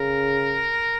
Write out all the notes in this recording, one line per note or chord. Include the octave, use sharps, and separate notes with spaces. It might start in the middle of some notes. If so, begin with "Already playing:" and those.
Already playing: C#3 A#4